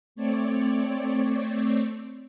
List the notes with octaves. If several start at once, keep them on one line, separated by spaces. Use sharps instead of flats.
A3 C4 C#5 D5